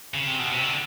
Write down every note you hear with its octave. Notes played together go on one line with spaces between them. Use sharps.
C#3
C3
B2
C3
D3